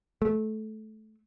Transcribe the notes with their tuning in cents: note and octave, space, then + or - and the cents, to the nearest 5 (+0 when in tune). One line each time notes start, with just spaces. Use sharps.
A3 -20